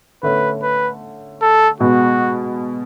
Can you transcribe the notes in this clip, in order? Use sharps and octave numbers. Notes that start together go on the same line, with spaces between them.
D3 A3 C#4 B4
B4
A4
B2 G#3 B3 F#4